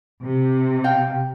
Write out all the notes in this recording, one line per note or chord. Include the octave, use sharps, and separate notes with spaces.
C3
F5 G5